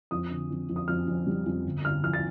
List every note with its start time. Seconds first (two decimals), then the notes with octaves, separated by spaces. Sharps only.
0.11 F2 D#6
0.30 D3
0.50 F2
0.69 F2
0.76 D#6
0.88 F2 F6
1.08 F2
1.27 G3
1.46 F2
1.65 G1
1.85 G1 F6
2.03 F3 F6
2.13 A6